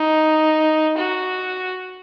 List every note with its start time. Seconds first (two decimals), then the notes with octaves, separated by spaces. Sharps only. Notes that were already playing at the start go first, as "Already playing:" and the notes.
Already playing: D#4
0.97 F#4